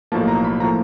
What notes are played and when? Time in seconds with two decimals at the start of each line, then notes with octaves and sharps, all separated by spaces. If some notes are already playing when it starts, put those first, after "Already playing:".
0.12 B1 A2 F3 A#3 A5
0.28 A#5
0.44 B5
0.60 A2 F3 A#3 A#5